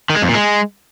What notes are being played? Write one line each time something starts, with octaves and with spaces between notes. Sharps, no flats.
D#3
G#3
F2
A#2
G#3